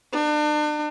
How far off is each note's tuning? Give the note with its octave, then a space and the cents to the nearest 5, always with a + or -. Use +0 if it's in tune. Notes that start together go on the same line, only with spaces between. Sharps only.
D4 +40